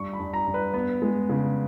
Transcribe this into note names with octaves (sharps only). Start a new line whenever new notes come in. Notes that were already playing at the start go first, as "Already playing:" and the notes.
Already playing: G2 C#6
B5
G2
A#5
G2
B4
B3
G#3
C#3